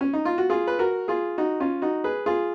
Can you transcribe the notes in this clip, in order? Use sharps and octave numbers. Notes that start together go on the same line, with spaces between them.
C#4
D#4
F4
F#4
F4 G#4
B4
F#4 A#4
F4 G#4
D#4 F#4
C#4 F4
D#4 F#4
G#4 B4
F4 G#4